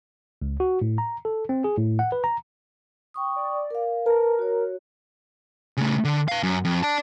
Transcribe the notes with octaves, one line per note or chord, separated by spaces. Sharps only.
C#2
F#4
A2
A#5
A4
C4
G#4
A2
F#5
B4
A#5
G5 C#6 D#6
D5
A#4 F5
A#4 B4 A5 A#5
F#4 C#5
C#3 A3
D3
B4 F5
F#2
F2
D5 A5